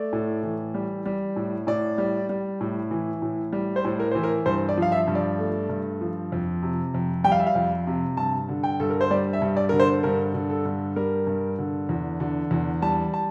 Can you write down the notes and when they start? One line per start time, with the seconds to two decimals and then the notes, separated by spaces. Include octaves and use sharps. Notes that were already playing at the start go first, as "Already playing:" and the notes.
Already playing: A3 D5
0.13 A2
0.43 E3
0.74 G3
1.06 G3
1.36 A2
1.67 A2 D5
1.98 G3
2.29 G3
2.61 A2
2.91 E3
3.22 A2
3.53 G3
3.76 C5
3.85 A2
4.00 A#4
4.12 E3 C5
4.23 A#4
4.46 G2 C5
4.69 D5
4.77 F3 F5
4.92 E5
5.08 G2
5.15 D5
5.39 A3
5.69 G2
6.01 F3
6.32 F2
6.62 C3
6.94 F2
7.24 G3 G5
7.32 F5
7.39 E5
7.47 F5
7.55 F2
7.87 C3
8.17 G2 A5
8.49 D3
8.64 G5
8.80 G2 A4
8.90 A#4
9.01 C5
9.11 G3 D5
9.33 E5
9.42 G2
9.57 D5
9.69 D3 A#4
9.80 C5
10.03 G2 A#4
10.34 D3
10.50 A4
10.65 G2
10.96 G3 A#4
11.27 G2
11.58 D3
11.89 E2
12.20 D3
12.51 E2
12.82 G3 A5
13.14 A5